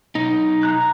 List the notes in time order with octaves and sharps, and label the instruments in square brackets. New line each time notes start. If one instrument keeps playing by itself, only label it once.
[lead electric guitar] B1 D#4
[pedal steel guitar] A#5 F#6